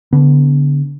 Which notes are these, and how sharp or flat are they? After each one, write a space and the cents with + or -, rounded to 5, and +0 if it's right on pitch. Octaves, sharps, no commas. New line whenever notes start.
D3 -25 B3 +0